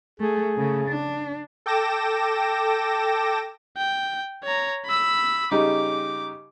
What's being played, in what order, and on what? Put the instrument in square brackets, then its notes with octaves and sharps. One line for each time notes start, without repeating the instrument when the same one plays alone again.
[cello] A3 [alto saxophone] G#4
[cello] C#3 A3
D4
[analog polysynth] A4 G5 D6 A#6 E7
[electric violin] G5
C#5 A#5
B5 E6
[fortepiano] C#3 G3 D#4 [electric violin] D6